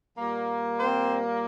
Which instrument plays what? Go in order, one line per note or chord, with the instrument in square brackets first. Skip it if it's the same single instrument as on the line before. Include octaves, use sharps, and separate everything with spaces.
[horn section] A#2 G3 A#3
C4 C5